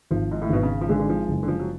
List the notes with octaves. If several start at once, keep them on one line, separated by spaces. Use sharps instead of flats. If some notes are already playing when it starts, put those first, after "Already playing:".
G#1 F3
G#2
A2
G#1 B2
C#3
F3
D3 G#3
D3
F3
F#1
D3
F3
F#3